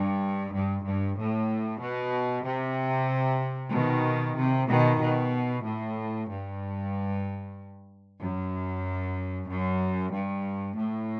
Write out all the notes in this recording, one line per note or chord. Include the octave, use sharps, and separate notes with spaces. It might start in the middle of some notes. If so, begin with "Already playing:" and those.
Already playing: G2
G2
G2
A2
B2
C3
B2 D#3
C3
B2 D#3
B2
A2
G2
F#2
F#2
G2
A2